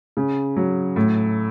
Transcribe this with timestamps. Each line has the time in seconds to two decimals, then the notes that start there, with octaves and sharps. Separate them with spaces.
0.17 C#3
0.57 F#3
0.96 A2